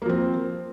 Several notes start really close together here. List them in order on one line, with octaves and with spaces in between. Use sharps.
A#3 F3 C4